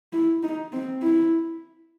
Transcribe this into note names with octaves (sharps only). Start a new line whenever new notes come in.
E4
D#4
C4
E4